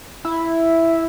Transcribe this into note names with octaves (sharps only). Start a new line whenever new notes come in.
E4